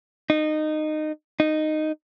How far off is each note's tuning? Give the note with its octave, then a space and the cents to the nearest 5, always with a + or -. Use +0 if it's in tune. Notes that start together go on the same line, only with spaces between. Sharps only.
D#4 -20
D#4 -10